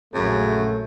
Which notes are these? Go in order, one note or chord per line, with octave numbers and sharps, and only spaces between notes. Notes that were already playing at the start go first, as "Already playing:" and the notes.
A#1 F#2 C#3 F#3 A3 G#4